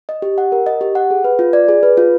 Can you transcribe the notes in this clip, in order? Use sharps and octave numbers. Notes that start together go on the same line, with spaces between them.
D#5
G4
F#5
A#4
D#5
G4
F#5
G#4
B4
F4
D5
G#4
B4
F4